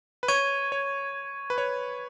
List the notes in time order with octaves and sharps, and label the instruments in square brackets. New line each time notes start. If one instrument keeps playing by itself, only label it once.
[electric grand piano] B4
[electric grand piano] C#5 [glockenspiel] C#6 G#6 D#7
[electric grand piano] C#5
B4
C#5